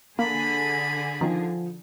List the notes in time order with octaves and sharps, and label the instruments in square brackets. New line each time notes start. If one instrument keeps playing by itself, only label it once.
[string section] D3 G#4 [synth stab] A#3 [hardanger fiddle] B5
[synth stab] D#3 [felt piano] F3